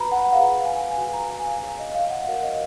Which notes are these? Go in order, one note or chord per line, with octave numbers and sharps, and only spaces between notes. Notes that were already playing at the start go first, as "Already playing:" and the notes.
Already playing: F#4 B4 A#5 B5
F#5
F4 G#4 B4 F5
G#5
G#5
F#4 B4 G#5
A#5
G#5
F5
D#4 G#4 C#5 F5
D#5
F5
F#5
F#4 A#4 C#5 F5
D#5